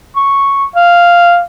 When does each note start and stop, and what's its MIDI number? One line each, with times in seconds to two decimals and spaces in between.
0.16 0.68 85
0.75 1.40 77